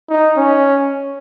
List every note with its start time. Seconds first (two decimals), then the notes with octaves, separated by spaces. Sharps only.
0.09 D#4
0.37 C#4